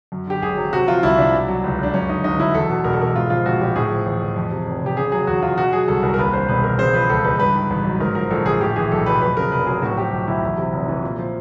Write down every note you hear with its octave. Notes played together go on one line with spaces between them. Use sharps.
F#2
D3 G4
G#1 G#4
F#3
C3 F#4
F3 F4
C2 E4
C2 D4
B2
F#3
C#2
C#2 D4
F#2 C#4
D3 D#4
G1 D#4
F#3 E4
E2 A4
B2
E1 A#4
A4
E1 A#4
G#2 F4
F3 F4
A#1 F#4
A#1 G4
A2 G#4
F3
A1
A1
F2
C3
F1
F1 G4
C#3 G#4
F#3 G#4
E2 F#4
E2 F4
B2 F#4
F#3 G#4
C2 A4
C2 A#4
A#4
D#2 B4
D3 C5
E1 B4
E1 A#4
C#3 C5
F3 B4
C#2 A4
C#2 B4
G2 B4
D#3
A1
F#3
G#2 A#4
F3 A#4
A#1 A4
A#1 G#4
A2 G4
E3 G#4
B1 A4
B1 B4
F2 B4
C#3 A#4
F1 B4
F#3 G#4
A2 F#4
F3 G4
B1
B1 E4
E2
C3
F1
E3
A#2
F3